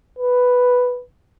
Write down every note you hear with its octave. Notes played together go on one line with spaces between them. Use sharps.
B4